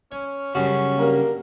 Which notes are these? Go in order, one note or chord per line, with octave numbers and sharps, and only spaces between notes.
C#4 C#5
F#2 C#3 G3 C#4 F#4
G2 A#3 A#4